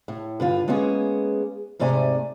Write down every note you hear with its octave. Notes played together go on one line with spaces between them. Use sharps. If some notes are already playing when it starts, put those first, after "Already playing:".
A2
G2 D3 F4
G#3 A#3 B3 C#4 G#4
G#2 C3 A3 D5 G#5 A#5